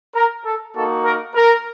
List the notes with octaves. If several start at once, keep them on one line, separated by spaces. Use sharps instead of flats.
A#4
A4
A#3 D#4 F#4 A4
A#4
A#4